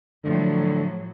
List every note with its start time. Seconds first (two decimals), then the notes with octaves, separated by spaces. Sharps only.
0.25 A2 D3 F3 F#3